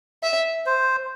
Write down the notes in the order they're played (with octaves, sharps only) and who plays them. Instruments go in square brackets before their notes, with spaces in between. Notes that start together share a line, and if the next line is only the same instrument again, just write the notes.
[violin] E5
[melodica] C5